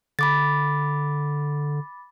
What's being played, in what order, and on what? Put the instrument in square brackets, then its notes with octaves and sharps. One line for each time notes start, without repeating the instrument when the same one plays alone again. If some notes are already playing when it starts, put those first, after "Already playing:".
[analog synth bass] D3 [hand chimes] B5 D6 A6